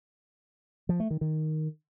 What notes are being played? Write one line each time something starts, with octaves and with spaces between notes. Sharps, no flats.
F3
A3
D#3
D#3